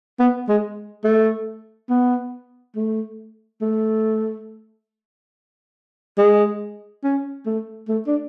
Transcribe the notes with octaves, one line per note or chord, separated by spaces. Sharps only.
B3
G#3
A3
B3
A3
A3
G#3
C#4
A3
A3
D4